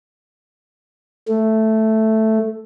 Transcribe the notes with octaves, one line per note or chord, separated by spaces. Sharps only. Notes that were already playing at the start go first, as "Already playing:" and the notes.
A3